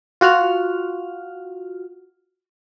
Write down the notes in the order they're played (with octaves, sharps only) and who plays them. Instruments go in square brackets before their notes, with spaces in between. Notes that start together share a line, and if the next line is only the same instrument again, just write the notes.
[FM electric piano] F4 F#4 F#5 F6